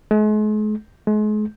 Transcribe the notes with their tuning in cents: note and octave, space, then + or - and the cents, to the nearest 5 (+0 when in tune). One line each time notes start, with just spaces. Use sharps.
G#3 +45
G#3 +40